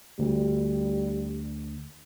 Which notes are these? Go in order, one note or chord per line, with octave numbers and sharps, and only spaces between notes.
D2 G3